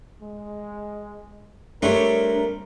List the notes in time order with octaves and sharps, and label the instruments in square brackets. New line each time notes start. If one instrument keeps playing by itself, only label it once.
[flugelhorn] G#3
[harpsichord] G3 A3 C4 [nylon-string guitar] D4 C#5 [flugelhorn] A#4